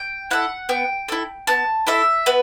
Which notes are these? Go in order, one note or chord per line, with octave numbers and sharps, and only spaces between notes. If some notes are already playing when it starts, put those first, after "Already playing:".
Already playing: G5
E4 A4 F#5
B3 G5
E4 A4
B3 A5
E4 A4 E5
B3 B4